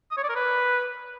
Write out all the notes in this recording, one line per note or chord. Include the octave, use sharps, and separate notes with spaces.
D#6
C#5
D5
A#4
B4